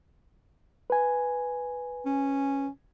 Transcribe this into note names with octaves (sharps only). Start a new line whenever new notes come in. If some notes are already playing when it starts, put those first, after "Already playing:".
B4 G#5
C#4